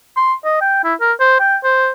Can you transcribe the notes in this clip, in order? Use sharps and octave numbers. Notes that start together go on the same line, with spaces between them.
C6
D#5
G5
E4
A#4
C5
G5
C5